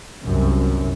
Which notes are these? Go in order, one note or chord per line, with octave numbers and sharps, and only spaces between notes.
G1 C2 F#2